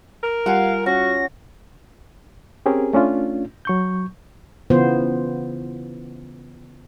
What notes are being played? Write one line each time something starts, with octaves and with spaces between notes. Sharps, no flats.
A#4
G3 F4 F5 F#5 G#5
C#4 F#4 A#6
C4 C#4 G4 G#4 A#4
A3 C#4 D4 F4
F#3 C#6 G6
C#3 E3 B3 F4 C5